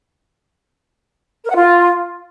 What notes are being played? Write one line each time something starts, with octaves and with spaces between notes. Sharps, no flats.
A#4
F#5
F4